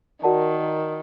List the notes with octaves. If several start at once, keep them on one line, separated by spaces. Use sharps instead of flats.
D#3 F#4 A#4 D5 F#5 A5